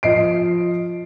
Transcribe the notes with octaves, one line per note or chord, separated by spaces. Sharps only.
F3 D#5 C7 D7